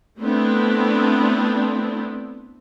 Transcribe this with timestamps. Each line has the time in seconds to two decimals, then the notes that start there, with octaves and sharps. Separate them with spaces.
0.20 A3 B3 C4 D4 E4